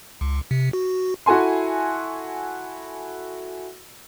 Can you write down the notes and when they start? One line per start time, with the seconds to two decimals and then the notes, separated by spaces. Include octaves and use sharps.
0.21 C#2
0.51 C3
0.73 F#4
1.26 E4 F#4 A4 G#5 C6